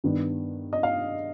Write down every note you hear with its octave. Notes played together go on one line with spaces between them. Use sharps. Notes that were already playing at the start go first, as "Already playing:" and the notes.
G2 D#3 B3 D4
D#5
F5